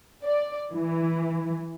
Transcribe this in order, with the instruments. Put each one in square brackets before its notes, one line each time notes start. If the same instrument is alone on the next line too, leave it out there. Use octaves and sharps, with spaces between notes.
[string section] D5
E3